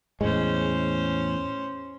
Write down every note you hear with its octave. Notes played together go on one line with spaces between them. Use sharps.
E2 A2 G#3 C#4 C5